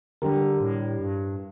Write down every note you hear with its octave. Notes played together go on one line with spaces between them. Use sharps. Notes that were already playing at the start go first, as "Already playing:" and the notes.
D3 G3 D4 G4 A#4
A2
G2